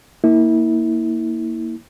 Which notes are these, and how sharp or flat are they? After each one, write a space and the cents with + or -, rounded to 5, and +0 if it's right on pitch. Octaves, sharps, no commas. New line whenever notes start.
A#3 +0 E4 -30